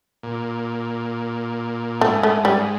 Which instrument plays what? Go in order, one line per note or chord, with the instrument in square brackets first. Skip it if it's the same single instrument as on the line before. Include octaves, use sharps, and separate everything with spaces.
[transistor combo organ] A#2
[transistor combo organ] G#2 [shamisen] A3
[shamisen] A3
G3